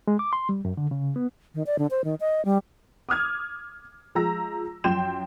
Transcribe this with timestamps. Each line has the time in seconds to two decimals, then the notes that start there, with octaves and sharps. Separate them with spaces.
0.08 G#3
0.19 D6
0.33 C6
0.49 G3
0.65 F#2
0.77 D3
0.91 C#3
1.16 B3
1.55 D#3
1.66 D5
1.79 D3
1.91 C5
2.04 D#3
2.20 D#5
2.45 G3
3.09 D6 D#6 F6 G#6
4.15 F3 G#3 A#5 E6 A#6
4.84 F#2 F3 G5 C6 G6 E7